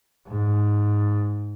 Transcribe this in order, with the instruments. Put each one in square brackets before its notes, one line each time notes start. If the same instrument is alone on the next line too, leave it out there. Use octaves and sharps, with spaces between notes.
[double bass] G#2